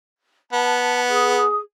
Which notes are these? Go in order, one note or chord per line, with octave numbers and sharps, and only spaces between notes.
B3 A5
G#4 D#6